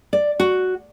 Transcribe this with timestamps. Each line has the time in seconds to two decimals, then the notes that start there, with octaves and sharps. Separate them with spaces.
0.13 D5
0.40 F#4